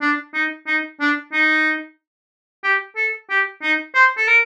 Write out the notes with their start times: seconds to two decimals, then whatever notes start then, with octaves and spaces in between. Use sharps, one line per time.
0.01 D4
0.34 D#4
0.67 D#4
1.01 D4
1.33 D#4
2.64 G4
2.96 A4
3.30 G4
3.62 D#4
3.95 C5
4.17 A4
4.27 A#4